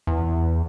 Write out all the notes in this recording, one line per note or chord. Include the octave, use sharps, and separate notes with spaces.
E2